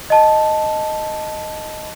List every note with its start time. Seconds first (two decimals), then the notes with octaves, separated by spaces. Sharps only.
0.10 D#5 A5